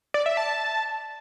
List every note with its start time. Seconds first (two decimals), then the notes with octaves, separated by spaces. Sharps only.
0.14 D5
0.26 E5
0.37 A5